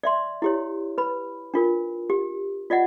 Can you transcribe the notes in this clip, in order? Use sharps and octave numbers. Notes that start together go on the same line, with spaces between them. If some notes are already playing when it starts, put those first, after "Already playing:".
D5 E5 C6
E4 G4 C#5
B4 B5
D4 F4 A#4
G4
F4 D5 D#5 F#5